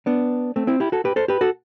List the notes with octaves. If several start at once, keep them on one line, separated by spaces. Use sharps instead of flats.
B3 D4
A3 C4
C4 E4
E4 G4
F#4 A4
G4 B4
A4 C5
G4 B4
F#4 A4